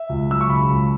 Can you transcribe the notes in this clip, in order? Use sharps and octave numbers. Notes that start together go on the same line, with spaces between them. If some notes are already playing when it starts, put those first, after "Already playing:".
Already playing: E5
C#2
F#3 E6
C#6
C#3 B5
C#2